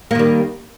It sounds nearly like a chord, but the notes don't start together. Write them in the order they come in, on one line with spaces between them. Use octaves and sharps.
A#3 D#3 G3